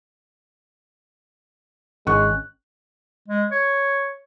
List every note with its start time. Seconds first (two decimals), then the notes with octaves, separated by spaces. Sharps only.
2.07 G#1 G#3 C#4 C#6 F#6
3.28 G#3
3.52 C#5